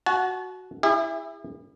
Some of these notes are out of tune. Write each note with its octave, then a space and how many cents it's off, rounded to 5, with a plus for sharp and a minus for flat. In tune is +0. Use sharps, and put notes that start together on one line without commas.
F#4 +0 A5 -40
E4 +0 G#4 -45 E5 +20